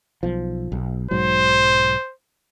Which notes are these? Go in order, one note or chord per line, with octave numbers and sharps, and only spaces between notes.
B1 F3
B1
B1 G#2 F#3 C5